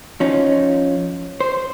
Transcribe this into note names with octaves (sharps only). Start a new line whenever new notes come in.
F3 C#4 D#4 F4
C5